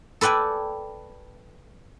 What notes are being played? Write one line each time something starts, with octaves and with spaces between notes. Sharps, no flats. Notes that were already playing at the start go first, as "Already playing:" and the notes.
A4 B4 D5 G5 G#5